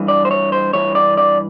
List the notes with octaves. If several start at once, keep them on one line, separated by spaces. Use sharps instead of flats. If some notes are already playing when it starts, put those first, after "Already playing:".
Already playing: G2 E3
D5
C5
C#5
C5
G2 E3 C#5
D5
D5